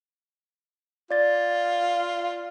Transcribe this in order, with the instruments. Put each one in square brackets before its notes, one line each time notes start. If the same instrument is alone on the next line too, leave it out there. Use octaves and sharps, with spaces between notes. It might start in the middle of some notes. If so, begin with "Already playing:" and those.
[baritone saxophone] F4 [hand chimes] D5 A6